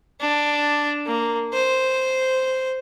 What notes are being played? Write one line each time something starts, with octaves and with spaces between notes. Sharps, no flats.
D4
A#3
C5